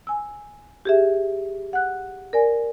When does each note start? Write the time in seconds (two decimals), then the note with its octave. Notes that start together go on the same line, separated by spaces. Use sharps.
0.07 G#5 E6
0.85 G4 G#4 E5
1.73 F#5 F#6
2.33 A#4 D5 G#5